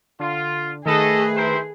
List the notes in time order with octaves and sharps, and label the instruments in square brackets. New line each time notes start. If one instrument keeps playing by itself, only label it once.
[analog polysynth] D3 [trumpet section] F4
[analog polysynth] D#3 A3 B4 [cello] G#4 [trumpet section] A4 D#5
[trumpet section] E4 A#4 C5